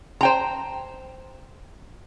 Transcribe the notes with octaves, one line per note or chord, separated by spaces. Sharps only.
C5 G5 A#5